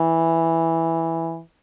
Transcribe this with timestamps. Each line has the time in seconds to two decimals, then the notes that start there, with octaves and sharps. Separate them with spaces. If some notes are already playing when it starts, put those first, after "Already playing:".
Already playing: E3